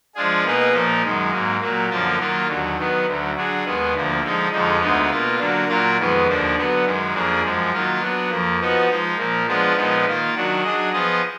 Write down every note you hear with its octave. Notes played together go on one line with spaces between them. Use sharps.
F3 G#3 D4 F4 G#4
B2 A#3 D#4 G#4 B4
A#2 F3 A#3 D#4
F#2 D#3 G#3
G#2 F#3 A#3
A#2 F#3 A#3
F#2 D3 F3 A#3 F4
D#3 F#3 A#3 F4
D#2 D3 F#3
D#3 F#3 B3
D2 D3 F#3
D3 F#3 D4 G#4
D#2 D#3 G#3 B3
D2 D3 F3 A#3
D3 F3 G#3 D#4
F2 D3 F3 G#3 D#4
D2 D3 G#3 B3 D#4
B2 A#3 F4
D3 F#3 A#3 D4
A#2 F#3 A#3 F4 A#4
F2 D#3 G#3 B3
D#2 D3 F3 A#3 D4
D3 F#3 B3
F#2 D#3 G#3
F2 F3 A#3 D4 G#4
F#2 F3 G#3
D#3 F#3 A#3 F4
F#3 B3 D4
F2 F3 A#3
F3 B3 D#4 F#4
F3 G#3 D#4
A#2 F3 A#3
F3 G#3 B3 D4 F4
A#2 F3 G#3 B3 D#4
D#3 A#3 F4
D#3 F#3 D4 F#4
F#3 D4 G#4 D#5
F3 B3 F4 G#4 D#5